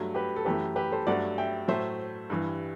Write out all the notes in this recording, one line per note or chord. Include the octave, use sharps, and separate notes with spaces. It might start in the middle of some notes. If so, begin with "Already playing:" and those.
Already playing: G2 F#3 A3
G4 B4
A4
F#2 E3 A3 G4 B4
G4 B4
A4 C5
G2 F#3 A3 D5 F#5
E5 G5
A2 F#3 A3 C5 E5
G2 E3 G3